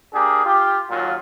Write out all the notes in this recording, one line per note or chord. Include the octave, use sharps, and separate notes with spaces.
A#3 D4 G4 G#4
F4 G4
D#2 A#2 F#3 F4